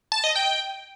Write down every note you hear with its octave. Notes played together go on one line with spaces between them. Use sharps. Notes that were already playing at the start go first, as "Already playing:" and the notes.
A5
D#5
G5